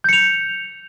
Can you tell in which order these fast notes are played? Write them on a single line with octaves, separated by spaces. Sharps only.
G6 C#7 F7